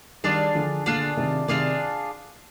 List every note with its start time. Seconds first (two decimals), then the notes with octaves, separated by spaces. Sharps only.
0.24 D#3 G3 D4 F4 G#4 D5
0.55 D3 F3
0.86 A#2 D3 D4 F4 G#4 D5
1.17 C3 D#3
1.48 C3 D#3 D4 F4 G#4 D5